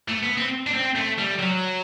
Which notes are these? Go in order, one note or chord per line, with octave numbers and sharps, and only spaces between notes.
A3
B3
C4
D4
C4
A3
G3
F#3